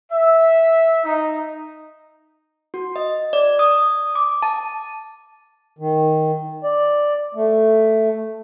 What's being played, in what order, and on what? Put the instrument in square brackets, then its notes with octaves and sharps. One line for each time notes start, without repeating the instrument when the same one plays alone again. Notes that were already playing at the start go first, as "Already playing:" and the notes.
[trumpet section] E5
D#4
[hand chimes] F#4
D#5
D5
D#6
D6
A5
[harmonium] D#3
D5
A3